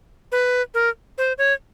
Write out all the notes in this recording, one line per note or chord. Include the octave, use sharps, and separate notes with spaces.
B4
A#4
C5
C#5